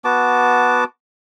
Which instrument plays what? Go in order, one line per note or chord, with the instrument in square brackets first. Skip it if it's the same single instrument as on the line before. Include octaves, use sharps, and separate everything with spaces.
[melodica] B3 F#4 A5 D6